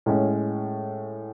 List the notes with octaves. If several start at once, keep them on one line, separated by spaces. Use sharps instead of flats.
A2 G#3 C#4